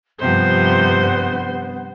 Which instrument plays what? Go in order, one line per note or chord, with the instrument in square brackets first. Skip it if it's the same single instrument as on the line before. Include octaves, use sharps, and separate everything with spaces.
[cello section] G2 [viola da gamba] C3 F3 [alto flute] B3 [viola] C5